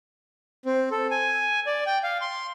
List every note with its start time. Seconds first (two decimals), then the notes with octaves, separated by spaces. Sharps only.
0.65 C4
0.91 A4
1.11 G#5
1.66 D5
1.86 G5
2.04 F5
2.21 C6